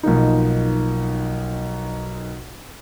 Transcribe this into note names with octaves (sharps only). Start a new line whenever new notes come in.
B1 F3 A#3 D#4